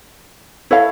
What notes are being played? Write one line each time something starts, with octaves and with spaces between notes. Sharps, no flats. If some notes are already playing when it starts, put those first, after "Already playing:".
E4 A4 C#5 F5